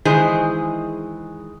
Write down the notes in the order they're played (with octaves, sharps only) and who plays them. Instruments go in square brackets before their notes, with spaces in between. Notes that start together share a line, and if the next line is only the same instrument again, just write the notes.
[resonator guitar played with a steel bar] D#3 E3 G#3 G#4 C5